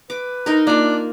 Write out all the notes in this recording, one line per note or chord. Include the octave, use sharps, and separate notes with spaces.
B4 D6
D#4 A#4
A#3 D4 F4